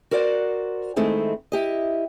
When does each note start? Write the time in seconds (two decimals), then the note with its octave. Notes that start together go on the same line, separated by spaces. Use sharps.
0.11 F#4 A#4 C5 D5 E5 F#5
0.96 D#3 G#3 A3 C4 D#4 E4
1.52 E4 G4 D#5